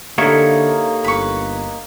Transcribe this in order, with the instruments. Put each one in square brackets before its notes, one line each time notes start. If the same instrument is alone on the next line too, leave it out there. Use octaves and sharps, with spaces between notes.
[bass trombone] D3 [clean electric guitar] A#3 D#4 C#5 [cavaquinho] E4 [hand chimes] G4 A4
[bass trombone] G1 [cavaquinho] B4 C#6